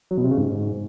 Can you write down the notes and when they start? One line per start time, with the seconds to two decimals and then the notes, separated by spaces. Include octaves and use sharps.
0.11 F#3
0.18 B2
0.24 C3
0.31 C#3
0.38 G#2